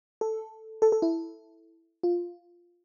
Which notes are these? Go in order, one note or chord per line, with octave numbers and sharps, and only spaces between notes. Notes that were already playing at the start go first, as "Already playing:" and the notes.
A4
A4
A4
E4
F4